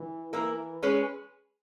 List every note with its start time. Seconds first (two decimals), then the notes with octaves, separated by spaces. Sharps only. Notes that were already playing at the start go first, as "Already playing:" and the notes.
Already playing: E3
0.33 E3 A#3 E4 A#4
0.83 G#3 C#4 G#4 B4